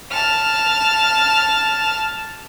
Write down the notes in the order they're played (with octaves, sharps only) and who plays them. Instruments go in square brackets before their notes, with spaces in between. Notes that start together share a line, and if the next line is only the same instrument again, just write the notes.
[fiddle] A5 F6